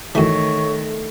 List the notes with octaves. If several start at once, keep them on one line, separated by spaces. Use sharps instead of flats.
F#2 D#3 E3 A3 C#5